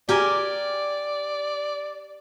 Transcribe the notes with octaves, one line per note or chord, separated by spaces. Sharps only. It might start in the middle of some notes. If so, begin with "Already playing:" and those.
G4 A#4 D5 G#5